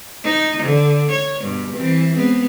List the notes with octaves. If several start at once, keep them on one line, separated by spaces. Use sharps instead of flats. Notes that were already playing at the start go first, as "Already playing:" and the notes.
D#4
D3
C#5
G2 B2
E3 C4
G#3 B3 C4